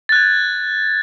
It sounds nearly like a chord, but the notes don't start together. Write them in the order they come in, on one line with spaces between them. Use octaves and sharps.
A6 F#6 G#6